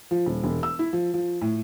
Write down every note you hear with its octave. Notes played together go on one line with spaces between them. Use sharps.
F3
D#1
E1
E6
E4
F3
F3
A2